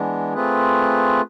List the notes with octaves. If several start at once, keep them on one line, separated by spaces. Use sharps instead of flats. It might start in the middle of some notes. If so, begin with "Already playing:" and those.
Already playing: E3 G#3 B3 D4
A3 C4 F4 G#4 B4